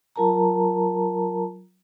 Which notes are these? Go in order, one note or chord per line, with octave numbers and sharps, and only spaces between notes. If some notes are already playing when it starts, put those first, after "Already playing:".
F#3 F4 A#4 A5 A#5